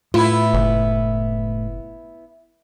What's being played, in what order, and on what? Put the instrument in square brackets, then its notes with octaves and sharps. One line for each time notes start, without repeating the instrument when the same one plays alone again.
[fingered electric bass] A2 [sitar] B3 E4 [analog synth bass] F4
[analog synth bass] F#1